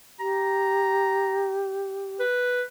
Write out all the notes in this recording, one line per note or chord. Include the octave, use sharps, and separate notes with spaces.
G4 A#5
B4